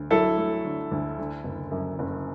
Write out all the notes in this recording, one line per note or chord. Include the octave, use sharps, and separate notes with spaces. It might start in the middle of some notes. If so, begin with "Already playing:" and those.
Already playing: D2
F#3 E4 A4
A3
D3
D2
D3
F#1
F#2
F#1